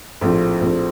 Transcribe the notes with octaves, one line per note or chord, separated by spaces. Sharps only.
A#1 A2 F3 C4
A#1 A2 F3 C4